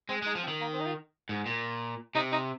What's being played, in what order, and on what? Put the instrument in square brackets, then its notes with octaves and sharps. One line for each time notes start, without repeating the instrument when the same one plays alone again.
[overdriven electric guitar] G#3 [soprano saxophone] C4
[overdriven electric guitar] G#3 [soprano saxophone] D#4
[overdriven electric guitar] F3
[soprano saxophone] C4
[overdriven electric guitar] D#3
[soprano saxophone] A#3
C4
D#4
F4
[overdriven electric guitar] G#2
A#2
[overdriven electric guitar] C3 [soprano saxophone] D#4
[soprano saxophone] D#4